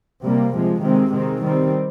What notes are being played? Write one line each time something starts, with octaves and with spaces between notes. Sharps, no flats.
C3 G3 A#3
C3 F3 G#3
C3 D#3 G#3 C4
D#3 G#3 C4
D#3 G3 C4